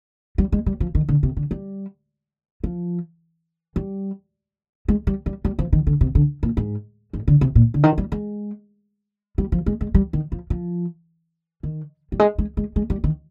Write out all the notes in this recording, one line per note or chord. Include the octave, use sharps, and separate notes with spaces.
G3
G#3
G3
F3
D#3
D3
C3
D3
G3
F3
G3
G#3
G3
G3
G3
F3
D#3
D3
C3
D3
A#2
G#2
G#2
D3
C3
A#2
D3
D#3
G3
G#3
G3
F3
G#3
G#3
G3
D#3
F3
F3
D#3
G3
G#3
G#3
G#3
G#3
G3
D#3